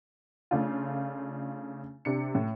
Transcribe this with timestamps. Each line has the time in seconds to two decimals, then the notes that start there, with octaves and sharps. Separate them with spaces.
0.51 C#3 A3 D4 F4
2.05 C3 D4 C#7
2.35 A2